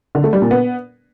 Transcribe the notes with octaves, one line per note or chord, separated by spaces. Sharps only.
D3
A3
G3
A#2
B3